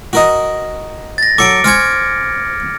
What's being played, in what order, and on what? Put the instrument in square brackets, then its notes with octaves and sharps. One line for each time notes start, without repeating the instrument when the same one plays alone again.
[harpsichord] F#4 A#4 D#5
[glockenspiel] A6 A#6
[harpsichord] F#3 A4 [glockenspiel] D6 C#7 D7
[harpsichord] C5 G#5 C#6 [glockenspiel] F6 G#6